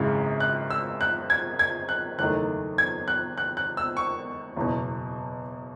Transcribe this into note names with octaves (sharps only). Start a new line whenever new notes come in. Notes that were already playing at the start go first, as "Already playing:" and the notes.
Already playing: G#1 F#2 C#3 E3 G#3
F#6
E6
F#6
G#6
G#6
F#6
F#1 E2 D#3 A3 F#6
G#6
F#6
F#6
F#6
E6
C#6
F#1 E2 B2